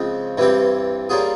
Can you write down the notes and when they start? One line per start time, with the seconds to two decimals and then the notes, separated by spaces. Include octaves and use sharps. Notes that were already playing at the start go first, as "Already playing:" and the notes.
Already playing: C#3 F3 G#3 C4
0.38 G2 E3 G3 C4 G4
1.09 G3 A#3 C#4 F4 G#4